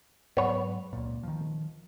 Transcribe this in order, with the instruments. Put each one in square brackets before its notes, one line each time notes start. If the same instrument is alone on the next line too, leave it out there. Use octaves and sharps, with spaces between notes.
[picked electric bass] G#2 F#3 [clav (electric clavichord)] B3 C#5
[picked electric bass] C#2 A#2
D#3 F3